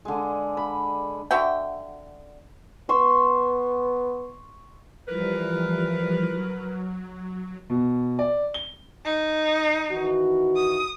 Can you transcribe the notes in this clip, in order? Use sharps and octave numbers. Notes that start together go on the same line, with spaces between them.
D3 G#3
B5
D3 F#4 E5 G5
B3 C6 C#6 E6
E3 F3 G3 A#4 B4
F#3
B2
D5
G7
D#4
D#3 E3 F#4
D#6